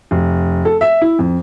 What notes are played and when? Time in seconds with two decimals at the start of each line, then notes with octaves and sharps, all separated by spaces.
0.11 F1
0.65 A4
0.81 E5
1.02 E4
1.19 F2